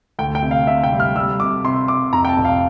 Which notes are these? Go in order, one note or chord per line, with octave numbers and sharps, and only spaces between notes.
D2 G5
G5
C3
F5
C3 E5
G5
G3
F6
G3 E6
C3 D6
C3 C6
C3 D6
F2 A#5
G5
A5
F1
F5